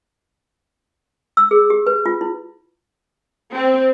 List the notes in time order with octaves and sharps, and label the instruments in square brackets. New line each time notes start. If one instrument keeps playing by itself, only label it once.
[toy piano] E6
G#4
G4
B4
F4
E4
[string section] C4